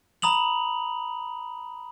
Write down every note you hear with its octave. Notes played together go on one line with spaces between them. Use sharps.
A#5 B5 D#6 F7 F#7